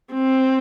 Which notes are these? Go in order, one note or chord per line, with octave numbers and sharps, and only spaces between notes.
C4